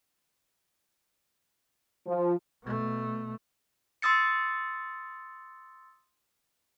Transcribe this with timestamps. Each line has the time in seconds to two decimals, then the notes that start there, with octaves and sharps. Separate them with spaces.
2.07 F3
2.63 B2 A3
4.02 C6 D#6 E6 A6 C#7